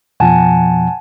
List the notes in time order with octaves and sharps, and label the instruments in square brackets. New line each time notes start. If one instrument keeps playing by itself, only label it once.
[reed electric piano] F2 B2 F3 [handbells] F#5 G#5 A5